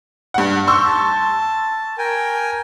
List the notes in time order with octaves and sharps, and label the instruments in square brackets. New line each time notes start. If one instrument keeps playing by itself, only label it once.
[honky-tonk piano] G2 F#5
[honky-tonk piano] C6 C#6 E6 [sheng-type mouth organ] G6
[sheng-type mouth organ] A5
A#4 G5 G#5